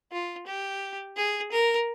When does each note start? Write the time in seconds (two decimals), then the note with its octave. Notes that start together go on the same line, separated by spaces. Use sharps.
0.12 F4
0.46 G4
1.17 G#4
1.52 A#4